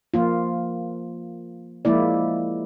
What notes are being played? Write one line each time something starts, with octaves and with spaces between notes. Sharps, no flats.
F3 A#3 F4
F3 G#3 A#3 E4 D5